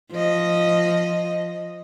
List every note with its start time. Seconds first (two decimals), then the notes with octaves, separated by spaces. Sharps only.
0.12 F3 D#5